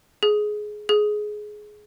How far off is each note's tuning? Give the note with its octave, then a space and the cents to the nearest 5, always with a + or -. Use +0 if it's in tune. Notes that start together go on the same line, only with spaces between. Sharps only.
G#4 +15
G#4 +15